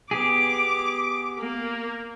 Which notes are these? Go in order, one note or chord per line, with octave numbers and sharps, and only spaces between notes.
B3 G4 G#4 D6
A#3